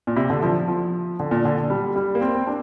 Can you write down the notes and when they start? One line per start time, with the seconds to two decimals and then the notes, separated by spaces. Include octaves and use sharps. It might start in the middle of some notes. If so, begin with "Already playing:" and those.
0.07 A#2
0.16 C3
0.30 D3
0.43 F3
0.68 F3
1.20 D3
1.31 A#2
1.45 D3
1.70 G3
1.96 G3
2.15 A#3
2.21 C4
2.35 C4
2.47 D4